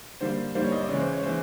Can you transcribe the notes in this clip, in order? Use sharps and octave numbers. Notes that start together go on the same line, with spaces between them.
D3 G3 A#3 C5
D3 G3 A#3 C5
C#5
D#5
D5
C#3 E3 G#3 C#5
C5
C#5
E3 G#3 C5